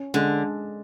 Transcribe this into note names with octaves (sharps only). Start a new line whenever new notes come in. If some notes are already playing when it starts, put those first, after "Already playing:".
Already playing: C#4
D3 G#3